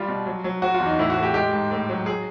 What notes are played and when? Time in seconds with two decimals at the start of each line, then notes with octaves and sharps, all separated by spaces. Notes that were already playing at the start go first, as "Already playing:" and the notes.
Already playing: G3 F4
0.08 B2
0.26 F#3
0.44 F#3
0.62 F#3 F#4
0.74 F4
0.80 E2
0.86 D#4
0.99 A2 E4
1.10 F#4
1.17 A2
1.23 G4
1.34 G#3 G4
1.53 G#2
1.71 A2
1.89 F#3
2.06 F#3 G#4